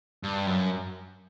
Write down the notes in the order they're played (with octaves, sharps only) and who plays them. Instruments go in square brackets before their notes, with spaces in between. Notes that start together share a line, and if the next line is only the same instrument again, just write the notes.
[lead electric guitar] G2
F#2